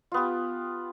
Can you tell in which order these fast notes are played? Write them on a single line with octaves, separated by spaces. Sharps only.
F4 B3 G4